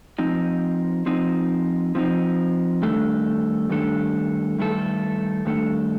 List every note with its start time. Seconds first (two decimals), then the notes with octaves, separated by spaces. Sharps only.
0.18 F3 C4 D#4
1.06 F3 C4 D#4
1.95 F3 C4 D#4
2.82 G2 D#3 A3 D4 A4
3.69 G2 D#3 A3 D4 A4
4.59 G2 D#3 A3 D4 A4
5.45 G2 D#3 A3 D4 A4